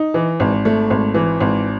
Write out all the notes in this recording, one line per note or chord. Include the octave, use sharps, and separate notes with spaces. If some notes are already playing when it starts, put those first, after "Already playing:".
Already playing: D#4
E3
G#1
A3
G#1
E3
G#1